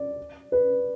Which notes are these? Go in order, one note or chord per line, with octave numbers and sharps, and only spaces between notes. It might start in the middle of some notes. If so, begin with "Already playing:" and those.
Already playing: D5
B4